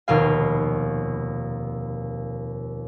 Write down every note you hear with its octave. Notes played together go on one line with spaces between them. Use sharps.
F1 D#2 B2 F4 F5